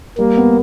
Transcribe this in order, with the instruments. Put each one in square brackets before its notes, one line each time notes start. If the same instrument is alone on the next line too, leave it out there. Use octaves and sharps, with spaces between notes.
[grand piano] G3 [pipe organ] A#3
[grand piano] B3